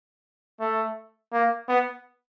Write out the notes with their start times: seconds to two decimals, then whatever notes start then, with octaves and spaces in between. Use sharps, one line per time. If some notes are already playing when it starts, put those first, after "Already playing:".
0.60 A3
1.33 A#3
1.68 B3